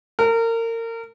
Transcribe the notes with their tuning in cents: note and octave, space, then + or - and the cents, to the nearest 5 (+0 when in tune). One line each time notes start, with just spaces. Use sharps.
A#4 -30